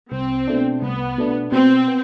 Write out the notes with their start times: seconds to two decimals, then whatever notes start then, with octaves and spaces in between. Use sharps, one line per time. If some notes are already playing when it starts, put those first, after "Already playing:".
0.12 C2 C4
0.47 B2 A3 D4
0.82 C2 B3
1.18 B2 A3 D4
1.52 B2 C4
1.88 B3